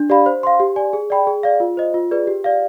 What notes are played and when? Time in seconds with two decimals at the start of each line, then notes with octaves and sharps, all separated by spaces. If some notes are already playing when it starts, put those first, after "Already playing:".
Already playing: D4
0.10 G4 D5 F5 B5
0.26 C5
0.43 F5 C6
0.60 G4
0.76 D5 G#5
0.93 G#4
1.10 D5 G5 B5
1.27 G#4
1.43 D5 F5
1.60 F4
1.77 C5 D#5
1.94 F4
2.11 G#4 B4 D5
2.27 G4
2.44 D5 F5